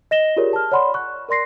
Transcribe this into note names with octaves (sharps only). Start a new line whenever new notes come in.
D#5 A#6 E7 G7
F4 G4 G#4 A#4 C#5 D5
A5 F6
C#5 D5 F#5 B5 C6
C#6 F#6
A#4 D5 C6 A#6 C7